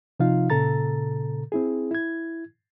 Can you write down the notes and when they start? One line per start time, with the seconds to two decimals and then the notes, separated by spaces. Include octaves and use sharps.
0.20 C3 F3 D#4 F4 F5
0.50 A#2 C#3 A4 A#5 A6
1.52 C4 E4 G#4
1.91 E4 G#6